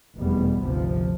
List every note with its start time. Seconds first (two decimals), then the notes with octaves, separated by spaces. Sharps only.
0.18 F1 E2 B2 G3 B3
0.61 G#1 D2 C3 F3